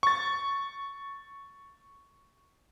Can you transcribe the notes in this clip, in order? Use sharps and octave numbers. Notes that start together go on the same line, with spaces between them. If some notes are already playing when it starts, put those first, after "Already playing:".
C#6 A6